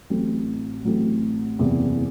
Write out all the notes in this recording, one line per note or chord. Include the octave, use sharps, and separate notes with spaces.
A1 A2 F#3 A3 C4
A1 A2 F#3 A3 C4
F#1 E2 C3